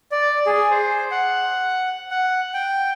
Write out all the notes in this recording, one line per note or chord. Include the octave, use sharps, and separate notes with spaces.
D5
G#4
C5
F#5
F#5
G5